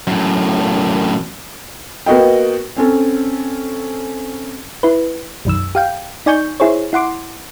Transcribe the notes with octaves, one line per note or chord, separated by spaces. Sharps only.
F#2 A2
A#3 B3 F#4 D#5 G5
C4 C#4 A4
E4 B4
B1 F#2 D#3 E6
G4 F5 G5
D#4 D5 G#5 C#6 G6
E4 G#4 C5 C#5
E4 F#5 C6 D6